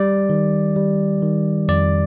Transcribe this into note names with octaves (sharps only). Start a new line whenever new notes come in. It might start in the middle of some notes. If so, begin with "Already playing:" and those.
Already playing: G3 D5
D#3
G3
D#3
F2 D5